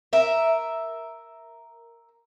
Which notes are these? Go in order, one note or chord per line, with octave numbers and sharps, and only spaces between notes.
A#4 E5